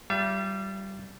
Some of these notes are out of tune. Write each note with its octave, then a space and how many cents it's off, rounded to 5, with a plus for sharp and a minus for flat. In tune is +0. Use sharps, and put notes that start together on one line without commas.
G3 -15 F4 +0 E5 +45